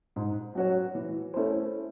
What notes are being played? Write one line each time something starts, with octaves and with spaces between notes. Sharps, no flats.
G#2
F#3 C#4 F#4 C#5
E3
A3 C#4 E4 C5